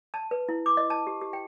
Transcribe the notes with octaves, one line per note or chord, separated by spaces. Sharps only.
A5
B4
E4
D6
D#5
A5
G4
G4
G5